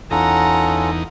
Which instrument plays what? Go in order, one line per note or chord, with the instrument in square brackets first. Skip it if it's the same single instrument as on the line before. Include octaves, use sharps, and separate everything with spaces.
[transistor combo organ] E2 D#4 [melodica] C#4 F4 A4 [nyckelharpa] F#5 A#5